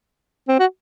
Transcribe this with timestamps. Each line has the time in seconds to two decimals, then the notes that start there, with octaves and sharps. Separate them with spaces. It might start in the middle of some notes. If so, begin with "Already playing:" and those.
0.48 C4
0.59 F#4